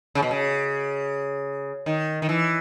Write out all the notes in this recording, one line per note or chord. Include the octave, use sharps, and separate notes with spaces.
C#3
B2
C#3
D#3
D#3
E3